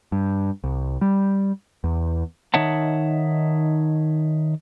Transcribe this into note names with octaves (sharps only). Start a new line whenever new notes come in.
G2
C2
G3
E2
D#3 D#4 C#5 E5 F#5 A5